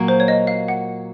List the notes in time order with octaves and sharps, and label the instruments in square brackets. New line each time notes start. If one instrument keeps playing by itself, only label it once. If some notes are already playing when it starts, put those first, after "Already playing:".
Already playing: [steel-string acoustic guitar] A#2 F#3 A#3
[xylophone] C5
C#5
D#5
F5
F#5